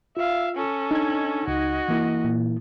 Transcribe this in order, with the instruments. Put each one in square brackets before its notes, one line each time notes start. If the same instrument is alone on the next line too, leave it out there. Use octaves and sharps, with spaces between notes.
[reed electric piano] F4 [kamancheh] E5 F5
[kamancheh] C#4 A4
[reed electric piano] D4 [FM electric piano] D#4 G#6
[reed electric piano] C#2 [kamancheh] F#4 D#5
[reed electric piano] E3 A#3 E4
[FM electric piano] A#2